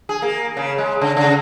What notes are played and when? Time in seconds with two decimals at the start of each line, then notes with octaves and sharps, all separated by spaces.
0.09 G#4
0.22 A#3
0.57 C#3
0.78 G#3
1.02 C#3
1.17 C#3